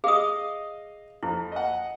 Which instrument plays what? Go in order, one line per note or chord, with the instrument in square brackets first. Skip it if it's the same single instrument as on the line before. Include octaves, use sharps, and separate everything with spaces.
[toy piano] G#4 D#6 [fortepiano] D#5 F5
[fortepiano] F2 [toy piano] E4
[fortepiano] D#5 F#5